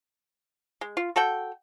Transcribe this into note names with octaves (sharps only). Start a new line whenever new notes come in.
G#3
F4
F#4 A4 F#5 G5